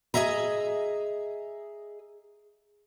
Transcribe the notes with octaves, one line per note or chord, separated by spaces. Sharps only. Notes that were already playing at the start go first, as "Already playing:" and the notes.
G#4 A4 D#5 E5 A#5